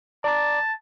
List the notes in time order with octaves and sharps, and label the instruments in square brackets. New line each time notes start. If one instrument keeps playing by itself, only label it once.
[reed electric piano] D5 A#5 D6 [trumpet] A5